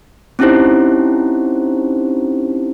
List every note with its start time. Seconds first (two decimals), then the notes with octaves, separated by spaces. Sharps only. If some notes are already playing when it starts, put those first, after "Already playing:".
0.39 C4 C#4 D#4 E4 G4 C5